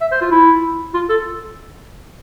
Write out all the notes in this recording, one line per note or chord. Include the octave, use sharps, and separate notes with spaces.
E5
C5
F4
E4
F4
A4